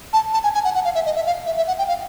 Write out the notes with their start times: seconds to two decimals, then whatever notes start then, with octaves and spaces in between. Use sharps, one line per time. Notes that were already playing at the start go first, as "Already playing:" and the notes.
0.13 A5
0.33 A5
0.44 G#5
0.54 G#5
0.65 F#5
0.75 F#5
0.85 F5
0.95 E5
1.06 D#5
1.16 E5
1.26 F5
1.46 E5
1.57 E5
1.68 F#5
1.78 G5
1.88 F5